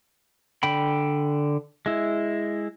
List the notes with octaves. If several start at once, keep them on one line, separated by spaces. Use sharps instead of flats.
D3 G5 B5
G#3 E4